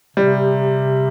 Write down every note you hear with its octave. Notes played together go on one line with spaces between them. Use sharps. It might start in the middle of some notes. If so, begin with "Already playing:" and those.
C3 G3